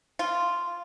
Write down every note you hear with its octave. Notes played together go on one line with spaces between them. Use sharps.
F4